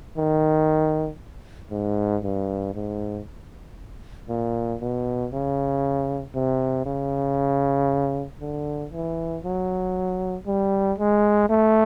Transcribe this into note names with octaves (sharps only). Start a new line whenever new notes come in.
D#3
G#2
G2
G#2
A#2
B2
C#3
C3
C#3
D3
E3
F#3
G3
G#3
A3